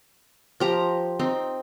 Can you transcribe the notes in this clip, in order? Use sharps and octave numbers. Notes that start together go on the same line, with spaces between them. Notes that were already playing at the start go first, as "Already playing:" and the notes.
F3 G4 A#5
C4 D#4